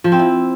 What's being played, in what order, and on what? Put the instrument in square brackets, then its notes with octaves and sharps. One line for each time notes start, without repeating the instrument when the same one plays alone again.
[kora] F3
C4
E4